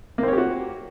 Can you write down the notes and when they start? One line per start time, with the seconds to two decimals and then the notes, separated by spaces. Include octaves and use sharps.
0.18 A#3
0.23 C4
0.28 C#5
0.33 G4
0.38 F#4